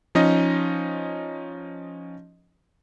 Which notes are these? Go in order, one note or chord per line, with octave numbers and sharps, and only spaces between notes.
F3 C#4 D#4 D#5